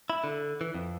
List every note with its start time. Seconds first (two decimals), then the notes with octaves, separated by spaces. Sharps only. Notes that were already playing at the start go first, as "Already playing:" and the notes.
0.10 E4
0.24 D3
0.61 E3
0.74 F2